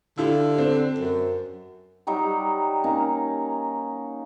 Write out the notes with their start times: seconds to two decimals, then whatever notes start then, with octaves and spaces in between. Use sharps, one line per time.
0.18 D3 E4 F4 G4
0.58 C4
0.98 F#2
2.07 F#3 G3 D#4 G4
2.84 A#3 C#4 D#4